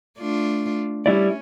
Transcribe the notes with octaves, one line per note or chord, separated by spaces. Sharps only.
A3 D4 F4
G3 C#4 E4 D5